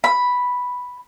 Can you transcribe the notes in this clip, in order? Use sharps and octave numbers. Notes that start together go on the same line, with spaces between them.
B5